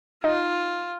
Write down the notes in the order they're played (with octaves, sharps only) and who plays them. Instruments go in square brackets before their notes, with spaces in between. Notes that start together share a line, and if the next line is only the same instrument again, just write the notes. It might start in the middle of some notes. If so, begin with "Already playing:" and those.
[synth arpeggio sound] D#4 [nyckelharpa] F4